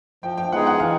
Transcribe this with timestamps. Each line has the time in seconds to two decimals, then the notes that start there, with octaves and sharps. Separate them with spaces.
0.23 F3 G5
0.37 G5
0.52 G#3 B3 D#4 G#4 F#5
0.67 F#5
0.80 E3 F5